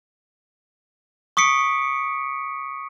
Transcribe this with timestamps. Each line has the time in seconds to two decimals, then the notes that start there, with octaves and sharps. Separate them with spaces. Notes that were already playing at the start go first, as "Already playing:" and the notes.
1.37 C#6 D#6 B6 C#7 D7